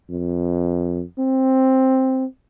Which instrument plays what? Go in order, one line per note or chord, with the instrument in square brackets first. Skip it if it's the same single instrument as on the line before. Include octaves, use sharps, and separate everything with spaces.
[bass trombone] F2
C4